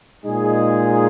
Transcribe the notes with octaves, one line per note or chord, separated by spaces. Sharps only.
A#2 G#3 D#4 G#4